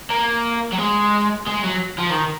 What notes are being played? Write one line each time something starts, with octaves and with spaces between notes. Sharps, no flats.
A#3
F#3
G#3
G#3
F#3
F3
D#3